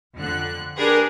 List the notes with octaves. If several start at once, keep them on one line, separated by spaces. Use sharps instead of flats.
F2 D3 F#6
D4 G4 G#4 A#4 B4